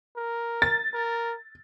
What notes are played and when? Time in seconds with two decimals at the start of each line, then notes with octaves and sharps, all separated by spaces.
0.17 A#4
0.62 A6
0.94 A#4